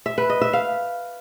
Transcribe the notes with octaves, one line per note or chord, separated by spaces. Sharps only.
E5
B4
D#5
E5
F5